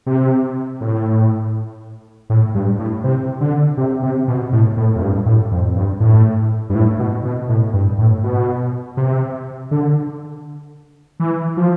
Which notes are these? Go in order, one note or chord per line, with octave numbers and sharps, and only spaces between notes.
C3
A2
A2
G2
A2
C3
D3
C3
C3
B2
A2
A2
F2
G2
A2
F2
G2
A2
G2
A2
B2
B2
A2
G2
A2
B2
C3
D3
E3
F3